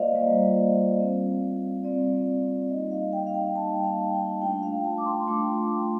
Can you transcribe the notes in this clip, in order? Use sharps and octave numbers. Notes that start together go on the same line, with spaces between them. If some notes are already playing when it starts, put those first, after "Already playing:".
Already playing: G3 A#3 F4 C5 D5 D#5 F5
G3 A#3 F4
G3 C4 F4
G3 C4 F4 D5
G3 A#3 D#4 D#5
F5
G5
F5
G5
G3 A#3 D#4 A5
F5
G5
A3 D4 F4 G5
F5
A5
D6
C6
A3 D4 F4 D6